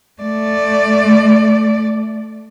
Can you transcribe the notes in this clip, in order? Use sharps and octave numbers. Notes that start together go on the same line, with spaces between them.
A3 D5